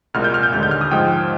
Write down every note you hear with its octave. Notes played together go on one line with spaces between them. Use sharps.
C2 A#2 G#3 F6
G6
F6
G6
D#2 D3 G#3 F6
G6
F6
D#6
G#2 F3 G#3 G5